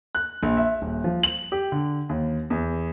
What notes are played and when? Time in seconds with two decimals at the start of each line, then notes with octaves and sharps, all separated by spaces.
0.15 F#6
0.43 A#1
0.57 E5
0.82 D#1
1.04 F3
1.23 F#7
1.52 G4
1.72 D3
2.09 D#2
2.50 E2